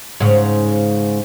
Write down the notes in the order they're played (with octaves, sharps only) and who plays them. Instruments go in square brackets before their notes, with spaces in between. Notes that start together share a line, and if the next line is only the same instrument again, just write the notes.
[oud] G#2 C#3